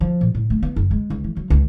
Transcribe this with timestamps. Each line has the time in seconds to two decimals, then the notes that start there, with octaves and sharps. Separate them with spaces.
0.01 F3
0.21 A#2
0.35 A2
0.50 A3
0.63 B3
0.76 F#1
0.91 G#3
1.10 C#2
1.24 E3
1.36 F#3
1.50 C#2